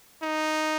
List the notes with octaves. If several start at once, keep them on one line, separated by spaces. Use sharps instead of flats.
D#4